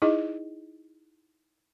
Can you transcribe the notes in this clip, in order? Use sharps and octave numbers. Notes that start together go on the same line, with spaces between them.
D#4 E4 G#4 D#5